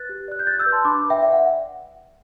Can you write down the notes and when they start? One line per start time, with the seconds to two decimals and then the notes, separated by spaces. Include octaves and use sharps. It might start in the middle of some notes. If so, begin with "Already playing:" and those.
Already playing: B4 F#6 A6
0.09 G4
0.28 D5 F#6
0.39 G6
0.47 G4 F#6 A6
0.59 E6 G6
0.66 B4
0.72 A5 C6
0.85 D4 B5 D6
1.04 B4
1.10 E5 G5
1.23 D5 E5
1.32 F#5